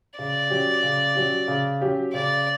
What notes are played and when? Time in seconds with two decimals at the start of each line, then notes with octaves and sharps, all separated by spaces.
0.18 C#3 D5
0.50 F#3 C#4 G4
0.83 C#3
1.15 F#3 C#4 G4
1.48 C#3
1.81 F#3 C#4 G4
2.13 C#3 D5